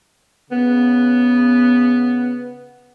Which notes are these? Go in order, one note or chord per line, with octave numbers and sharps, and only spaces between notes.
C#3 B3